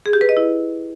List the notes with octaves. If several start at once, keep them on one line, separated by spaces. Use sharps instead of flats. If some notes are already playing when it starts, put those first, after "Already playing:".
G#4
G4
B4
D#5
E4